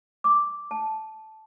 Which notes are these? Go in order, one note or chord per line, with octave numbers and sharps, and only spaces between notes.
D6
A5